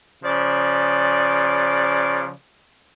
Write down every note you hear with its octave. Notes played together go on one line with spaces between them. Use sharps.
C#3 F3 D5